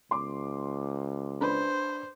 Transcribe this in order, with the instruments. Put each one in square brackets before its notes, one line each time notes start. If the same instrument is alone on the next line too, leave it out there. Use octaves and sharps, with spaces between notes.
[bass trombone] C#2 [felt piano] C6 D6
[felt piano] D4 B4 B5 [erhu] C5